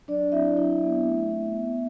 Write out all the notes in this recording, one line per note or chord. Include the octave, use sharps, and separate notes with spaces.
F#3 D4 D5
C4 E4 F#4 E5
F#3 E4 E5
B3 E4
A3
C4 E4
B3